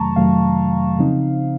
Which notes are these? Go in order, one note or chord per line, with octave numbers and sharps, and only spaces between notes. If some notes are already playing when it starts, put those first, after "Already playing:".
Already playing: F2 C3 D#3 F#3 A3 A5 A#5 C#6
F2 C3 D#3 F#3 A3 F5
C#3 F3 C4 D#4